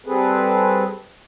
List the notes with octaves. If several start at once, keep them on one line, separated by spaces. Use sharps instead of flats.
G3 C4 G#4 A4 B4